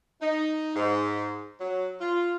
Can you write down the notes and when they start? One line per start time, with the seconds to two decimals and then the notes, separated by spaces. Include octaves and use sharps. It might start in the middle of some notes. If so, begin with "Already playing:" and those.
0.21 D#4
0.76 G#2
1.60 F#3
2.01 F4